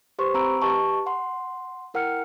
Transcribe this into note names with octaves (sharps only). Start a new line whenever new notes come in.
G4 B4 C5 C6 C#6
C4 A#5 B5 E6 D7
G4 B4 D#5 A5 C#6
F#5 C6
E4 A#4 F#5 G5 F6 C#7